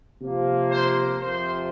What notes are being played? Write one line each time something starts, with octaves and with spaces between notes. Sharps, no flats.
C3 F3 A#3
C5
F2 C3 F3 C5